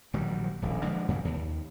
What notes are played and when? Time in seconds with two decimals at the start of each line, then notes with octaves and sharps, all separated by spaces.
0.14 A#1 D#3 F#3 G3
0.62 D#1 A#1
0.84 D3 F3 G#3 A#3
1.08 G2 C#3 E3 G3
1.25 D#2